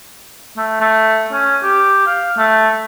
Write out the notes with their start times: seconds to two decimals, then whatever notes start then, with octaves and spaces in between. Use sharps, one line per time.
0.57 A3
0.81 A3
1.32 C#4
1.63 G4
2.06 F5
2.38 A3